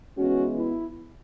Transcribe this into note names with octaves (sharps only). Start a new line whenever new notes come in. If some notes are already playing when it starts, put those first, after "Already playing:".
E3 G#3 B3 C#4 F#4
E4